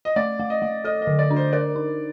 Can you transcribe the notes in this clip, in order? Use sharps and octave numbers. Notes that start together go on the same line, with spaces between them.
D#5
A3 D5
A3
D#5
A3
A4 D#5
D#5
D3
D5
D4
C5
A#4 D5
D#4